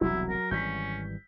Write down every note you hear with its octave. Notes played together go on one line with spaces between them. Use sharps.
E1 C2 F#3 E4
A#4
G#1 E3 G3 C#4 G6 B6